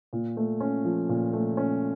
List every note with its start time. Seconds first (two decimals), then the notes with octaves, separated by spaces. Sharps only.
0.13 A#2
0.37 A3
0.60 C#4
0.85 F3
1.09 A#2
1.33 A3
1.57 C#4